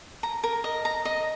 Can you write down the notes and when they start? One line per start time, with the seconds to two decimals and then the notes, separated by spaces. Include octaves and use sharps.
0.23 A#5
0.44 A#4
0.64 D#5
0.85 A#5
1.05 D#5